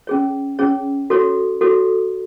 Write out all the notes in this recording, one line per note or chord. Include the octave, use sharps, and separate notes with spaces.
C#4 G#4 C#5
C#4 G#4 C#5
F#4 A4 C#5
F#4 A4 C#5